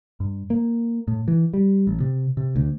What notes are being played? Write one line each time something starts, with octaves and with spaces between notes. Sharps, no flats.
G2
A#3
A2
E3
G3
A1
C3
C3
D2